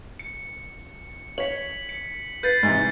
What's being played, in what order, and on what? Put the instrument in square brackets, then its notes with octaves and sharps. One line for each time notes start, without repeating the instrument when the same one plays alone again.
[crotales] C#7
[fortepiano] C#5 [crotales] B6 F#7
[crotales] C#7
[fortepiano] B4 [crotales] G6 A6 C7
[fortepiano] G#2 C3 E3